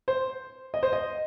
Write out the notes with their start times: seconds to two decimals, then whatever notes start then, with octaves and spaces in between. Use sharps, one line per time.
0.08 C5
0.74 D#5
0.83 C5
0.93 D#5